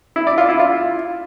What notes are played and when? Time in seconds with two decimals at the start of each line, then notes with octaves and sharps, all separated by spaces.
0.16 E4
0.27 D5
0.38 F4
0.49 E4
0.60 F4